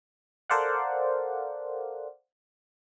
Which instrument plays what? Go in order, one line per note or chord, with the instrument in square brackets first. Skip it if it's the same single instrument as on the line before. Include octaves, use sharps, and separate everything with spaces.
[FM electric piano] A4 A#4 C5 D5 F5 F#5